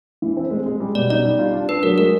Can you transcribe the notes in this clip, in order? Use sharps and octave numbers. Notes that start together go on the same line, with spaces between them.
E3
C4
G#3
G#3
G3
B2 D5
D#4 D5
G3
F4
D4
D4 B4
F#3 A#4
G#3 A#4